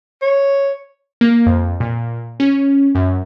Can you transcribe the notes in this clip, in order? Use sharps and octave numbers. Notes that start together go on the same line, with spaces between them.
C#5
A#3
F2
A#2
C#4
F#2